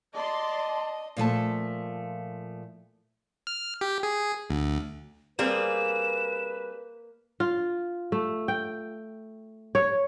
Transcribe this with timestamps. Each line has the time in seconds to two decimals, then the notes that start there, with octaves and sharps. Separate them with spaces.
0.15 D5 D#5 A5 C6
1.17 A#2 F3 A3 A5
3.47 F6
3.81 G4
4.03 G#4
4.50 D2
5.39 G3 A#3 C4 G#4 B4 E7
7.40 F4
8.12 A3
8.48 G5
9.75 C#5